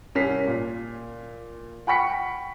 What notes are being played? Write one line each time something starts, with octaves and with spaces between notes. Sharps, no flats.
C2 C#4 A#4 B6 C7
A#2
F#5 G5 B5 C#6 B6 C#7